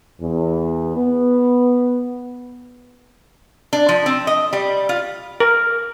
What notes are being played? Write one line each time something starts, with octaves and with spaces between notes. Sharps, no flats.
E2
B3
D4
F3
C4
D#5
G3
F4
A#4